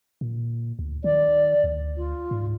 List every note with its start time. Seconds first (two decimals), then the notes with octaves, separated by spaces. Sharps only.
0.21 A#2
0.79 D2
1.04 D#3 D5
1.64 D2
1.97 F4
2.31 G#2